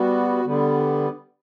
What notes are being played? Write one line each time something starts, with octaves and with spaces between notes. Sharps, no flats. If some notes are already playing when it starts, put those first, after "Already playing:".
Already playing: G3 B3 F#4
D3 G3 B3